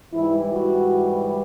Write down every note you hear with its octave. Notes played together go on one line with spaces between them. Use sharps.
G#2 E3 G3 E4
F#4